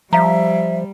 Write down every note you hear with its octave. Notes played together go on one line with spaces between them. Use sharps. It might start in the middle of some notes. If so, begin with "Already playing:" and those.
F3 G3 E5 F5 A#5